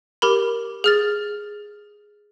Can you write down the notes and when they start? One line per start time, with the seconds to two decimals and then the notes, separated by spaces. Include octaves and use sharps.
0.22 G4 A#4 B5
0.84 G#4 F6 A6